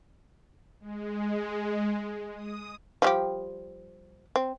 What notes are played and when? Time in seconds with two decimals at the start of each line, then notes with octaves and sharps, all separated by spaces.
0.80 G#3
2.34 D#6
3.02 F3 G3 G4
4.36 C4